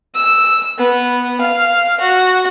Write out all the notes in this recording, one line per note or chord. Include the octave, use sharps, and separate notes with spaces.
E6
B3
F5
F#4